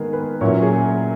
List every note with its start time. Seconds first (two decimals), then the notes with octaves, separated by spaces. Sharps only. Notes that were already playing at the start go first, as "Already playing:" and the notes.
Already playing: D#3 G#3 B3 G#4 A#4
0.13 B4
0.41 A#2 F#3 C#4 E4 C#5
0.62 G#4